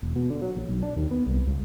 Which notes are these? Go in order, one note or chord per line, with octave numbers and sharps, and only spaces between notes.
E1
B2
D3
F#3
A#1
B1
D4
D#2
B3
C2
C#2